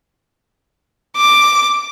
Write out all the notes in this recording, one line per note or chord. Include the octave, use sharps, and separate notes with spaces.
D6